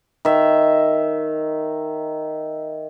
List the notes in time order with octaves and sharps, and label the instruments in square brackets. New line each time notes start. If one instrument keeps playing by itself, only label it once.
[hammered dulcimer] D#3 E5